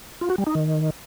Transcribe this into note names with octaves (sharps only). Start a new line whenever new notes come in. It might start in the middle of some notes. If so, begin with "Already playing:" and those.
F4
F#4
G3
D#4
D#3